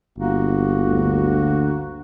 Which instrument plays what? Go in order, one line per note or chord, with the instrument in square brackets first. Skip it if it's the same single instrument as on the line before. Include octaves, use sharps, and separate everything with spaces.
[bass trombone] G1 [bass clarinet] A#3 [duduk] F#4
[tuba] D2